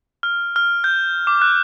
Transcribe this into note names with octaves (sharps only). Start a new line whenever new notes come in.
F6
F6
G6
D6
F#6